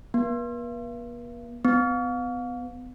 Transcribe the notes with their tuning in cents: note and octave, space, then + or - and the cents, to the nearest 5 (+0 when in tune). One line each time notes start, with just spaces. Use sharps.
B3 -45
B3 +30